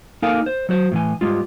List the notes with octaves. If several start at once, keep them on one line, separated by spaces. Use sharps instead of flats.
A#3 D#4 A4 A#4 F5 G#5
C5
F#3 F#4 C5
A2 E3 G#5
G#2 F3 G3 G#3 F4